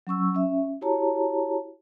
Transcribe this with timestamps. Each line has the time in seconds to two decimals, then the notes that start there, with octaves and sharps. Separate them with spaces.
0.07 F#3 C#4 C#6 E6
0.35 C#4 E5
0.81 E4 F#4 G4 C#5 A5 A#5